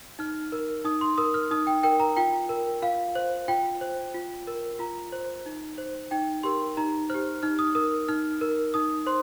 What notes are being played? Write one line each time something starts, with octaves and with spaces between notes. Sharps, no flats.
D#4 F6
A#4
D#4 D#6
C6
A#4 D#6
F6
D#4 D#6
G5
A#4 G5
A#5
F4 G5
A#4
F4 F5
C5
F4 G5
C5
F4
A#4
F4 A#5
C5
D#4
C5
D#4 G5
G4 A#4 C6
D#4 A#5
G4 C5 F6
D#4 F6
D#6
A#4 D#6
D#4 F6
A#4
D#4 D#6
C5 C6